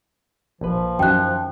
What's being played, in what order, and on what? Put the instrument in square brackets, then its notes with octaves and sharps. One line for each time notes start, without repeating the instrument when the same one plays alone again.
[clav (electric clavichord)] A#1 B4 [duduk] F3
[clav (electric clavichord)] F#2 D#3 F#4 [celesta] G5 F#6